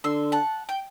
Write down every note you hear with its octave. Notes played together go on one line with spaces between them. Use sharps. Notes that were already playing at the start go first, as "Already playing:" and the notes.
D3 C6 E6
F#5 A5
G5